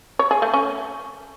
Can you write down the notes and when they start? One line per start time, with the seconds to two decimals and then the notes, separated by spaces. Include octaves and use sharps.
0.19 C#5
0.31 G#4
0.42 A3
0.54 C#4